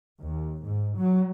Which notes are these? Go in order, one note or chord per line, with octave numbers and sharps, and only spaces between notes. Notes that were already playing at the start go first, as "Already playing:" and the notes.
D#2
G#2
F#3